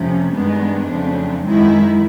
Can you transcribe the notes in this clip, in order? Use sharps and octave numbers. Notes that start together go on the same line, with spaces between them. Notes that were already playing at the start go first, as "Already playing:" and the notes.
Already playing: F2 C3 F3 A3 C#4
G2 D#3 G#3 B3 D4
F2 C#3 F#3 A3 C4
F#2 D#3 G#3 E4